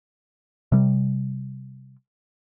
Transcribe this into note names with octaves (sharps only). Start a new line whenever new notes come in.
C3 G3